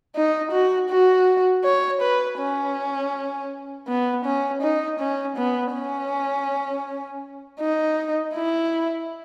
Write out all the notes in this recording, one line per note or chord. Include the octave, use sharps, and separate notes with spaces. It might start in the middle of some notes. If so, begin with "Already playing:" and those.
D#4
F#4
F#4
C#5
B4
C#4
B3
C#4
D#4
C#4
B3
C#4
D#4
E4